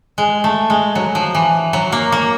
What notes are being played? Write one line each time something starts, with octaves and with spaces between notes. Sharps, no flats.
G#3
A3
G#3
F#3
F3
E3
F#3
A#3
A#3